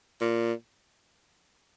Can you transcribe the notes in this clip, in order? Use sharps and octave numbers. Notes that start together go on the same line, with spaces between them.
A#2